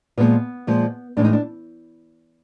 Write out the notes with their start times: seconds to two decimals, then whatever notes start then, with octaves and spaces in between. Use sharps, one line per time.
0.18 A#2 F3 G#3 B3
0.67 A#2 F3 G#3
1.17 A2 E3 G#3 D4
1.24 D#4
1.33 D4